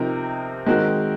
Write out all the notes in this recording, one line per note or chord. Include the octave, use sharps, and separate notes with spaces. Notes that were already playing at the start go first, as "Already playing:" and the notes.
Already playing: C3 F3 C4 D#4 A#4
D#3 G#3 C4 F#4 A#4